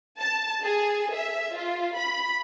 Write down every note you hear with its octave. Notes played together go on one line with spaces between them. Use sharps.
A5
G#4
E5
F4
B5